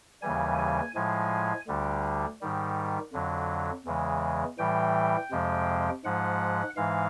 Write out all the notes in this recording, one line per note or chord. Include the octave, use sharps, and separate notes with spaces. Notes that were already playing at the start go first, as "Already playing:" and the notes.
D#2 C#3 E3 G3 G#5
G#5
A2 F3 G#3 G#5
D2 D3 G3
G#2 D#3 G3
F2 D3 F#3
E2 C#3 E3 G#3
A2 E3 G3 G5
F2 C3 F3 G#3
G#2 F3 G#3 F#5
G#2 E3 G#3 F5